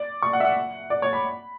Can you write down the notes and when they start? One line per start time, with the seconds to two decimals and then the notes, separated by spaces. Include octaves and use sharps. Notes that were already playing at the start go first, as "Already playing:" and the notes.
Already playing: D5
0.22 C#6
0.33 F#5
0.40 E5
0.45 F#5
0.90 D5
1.02 C#5
1.13 B5